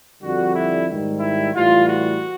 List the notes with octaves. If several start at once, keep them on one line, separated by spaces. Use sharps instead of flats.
F2 D3 G3 F#4
E4
G#2 D#3 G3
E4
A2 E3 G3 F4
F#4